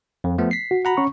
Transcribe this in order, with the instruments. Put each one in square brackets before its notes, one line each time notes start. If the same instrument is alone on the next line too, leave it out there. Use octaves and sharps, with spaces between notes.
[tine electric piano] F2
F3 A3 B3
B6 C7
[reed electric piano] F#4
[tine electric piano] F#5 A#5 B5
[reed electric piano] C#4 C#6